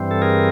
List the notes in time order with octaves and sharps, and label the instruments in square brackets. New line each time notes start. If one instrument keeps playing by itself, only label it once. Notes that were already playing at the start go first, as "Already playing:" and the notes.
Already playing: [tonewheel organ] G2 E3 G3 C4
A4
G#4 A#4